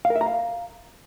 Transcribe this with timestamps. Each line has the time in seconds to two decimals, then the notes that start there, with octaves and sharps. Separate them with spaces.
0.05 F5
0.10 A#4
0.16 E5
0.21 A#5
0.26 F5